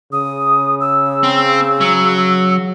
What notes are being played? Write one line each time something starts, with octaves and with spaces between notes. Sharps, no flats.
C#3 D#6
E6
C4
F#3